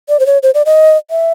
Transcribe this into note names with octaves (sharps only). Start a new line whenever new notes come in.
D5
C5
C#5
C5
D5
D#5
E5